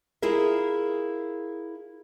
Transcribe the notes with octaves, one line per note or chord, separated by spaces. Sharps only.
E4 F4 G#4 A#4 E5